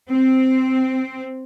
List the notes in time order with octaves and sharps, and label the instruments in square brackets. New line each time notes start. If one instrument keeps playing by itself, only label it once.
[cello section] C4